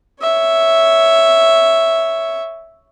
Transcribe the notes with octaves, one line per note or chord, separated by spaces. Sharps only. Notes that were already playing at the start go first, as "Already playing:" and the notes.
C#5 E5